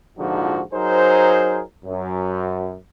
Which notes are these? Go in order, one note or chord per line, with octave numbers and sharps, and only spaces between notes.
A#1 G#2 D3 F3 D#4 F#4
F#3 D#4 G#4 A#4 C5
F#2